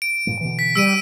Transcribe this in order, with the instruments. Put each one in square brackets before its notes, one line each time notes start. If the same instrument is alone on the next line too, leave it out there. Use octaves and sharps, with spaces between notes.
[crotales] D7
[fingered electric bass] G2 A#2 G3
B2 D3 E3
[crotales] B6
[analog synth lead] G3 [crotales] E6 D7 D#7